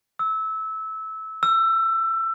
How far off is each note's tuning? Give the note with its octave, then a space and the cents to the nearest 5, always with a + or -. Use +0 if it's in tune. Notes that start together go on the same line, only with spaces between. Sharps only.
E6 -20
E6 +20